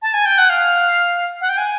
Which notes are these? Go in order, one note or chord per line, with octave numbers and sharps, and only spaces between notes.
A5
G#5
G5
F#5
F5
F#5
G5
G#5